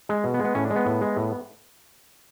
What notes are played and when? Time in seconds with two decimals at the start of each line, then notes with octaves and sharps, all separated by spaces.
0.09 G#3
0.24 B2
0.34 B3
0.39 G#3
0.44 B3
0.55 A2 C#4
0.65 D4
0.70 G#3
0.76 B3
0.86 A2
1.01 G#3
1.16 A2